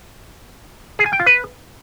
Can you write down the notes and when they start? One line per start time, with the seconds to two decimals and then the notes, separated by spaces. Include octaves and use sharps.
0.99 G#4
1.06 G#5
1.13 G5
1.20 F4
1.26 B4